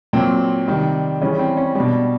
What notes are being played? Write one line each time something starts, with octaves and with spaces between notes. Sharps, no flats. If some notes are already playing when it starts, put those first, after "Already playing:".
A#2 F#3 C4
C3 D#3 G3
C#3 E3 G3 C#4
C4
C#4
B2 G3 D4